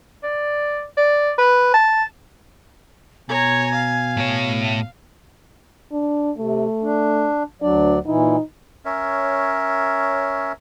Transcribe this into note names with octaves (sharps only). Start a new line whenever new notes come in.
D5
D5
B4
A5
B2 C#5 G#5 A#5
F5
A2 C#5
D4
C3 A3
D4
D2 F#3 D4 D5
A#2 E3 D#4 E4
C#4 A#4 C#5 E5